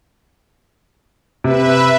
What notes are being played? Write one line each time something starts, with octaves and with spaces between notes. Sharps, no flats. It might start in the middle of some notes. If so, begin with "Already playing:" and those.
C3 B4 E5